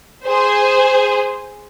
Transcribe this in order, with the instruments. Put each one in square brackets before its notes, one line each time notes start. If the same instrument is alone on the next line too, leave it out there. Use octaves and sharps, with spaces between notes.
[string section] G#4 C5